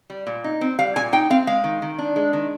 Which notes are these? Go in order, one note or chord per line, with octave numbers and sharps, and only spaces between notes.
G3
A#2
D#4
C4
G3 F5
A#2 G#5
D#4 G5
C4 F5
G#3 F5
D#3
D#3
D4
G#3
D#3